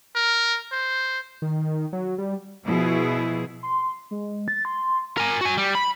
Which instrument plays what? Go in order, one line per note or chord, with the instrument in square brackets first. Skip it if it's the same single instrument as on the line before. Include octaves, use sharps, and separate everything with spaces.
[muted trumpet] A#4
C5
[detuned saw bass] D#3
F#3
G3
[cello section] B2 F3 E4 G#4
[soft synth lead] C6
G#3
A6
C6
[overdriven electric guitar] A#4 G#5
F#4 G#5
G3
B5